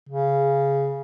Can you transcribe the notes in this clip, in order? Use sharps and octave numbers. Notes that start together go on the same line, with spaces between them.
C#3